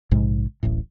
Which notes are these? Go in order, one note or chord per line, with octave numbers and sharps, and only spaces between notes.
A#1 G#2 C3 G#3
D1 A1 A2